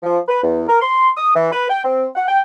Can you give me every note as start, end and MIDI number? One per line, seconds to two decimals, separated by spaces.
0.03 0.19 53
0.28 0.40 71
0.44 0.63 40
0.68 0.81 70
0.82 1.10 84
1.17 1.34 87
1.35 1.51 52
1.52 1.68 71
1.70 1.85 79
1.85 2.06 60
2.16 2.26 78
2.28 2.40 79